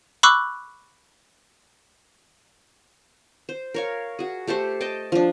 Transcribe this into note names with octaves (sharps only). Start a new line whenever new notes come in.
B5 C#6 D6 E6 F#6
C5
A#4 C#5 F5
F#4 G#4
A3 G4 A4 C5
D#5 G5 A5
F3 D4